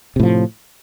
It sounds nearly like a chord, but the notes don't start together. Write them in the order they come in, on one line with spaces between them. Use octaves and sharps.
C3 A2 F3